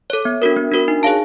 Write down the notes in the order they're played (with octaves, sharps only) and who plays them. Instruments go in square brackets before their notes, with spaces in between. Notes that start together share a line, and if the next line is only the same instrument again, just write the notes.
[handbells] A4 C#5
B3
D4 F#4 A#4
B3
D4 F#4 A#4
D#4
G#4 C#5 F5 A5